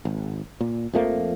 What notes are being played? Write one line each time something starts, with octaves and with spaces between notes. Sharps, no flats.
G#1
A#2
F2 F3 A3 A#3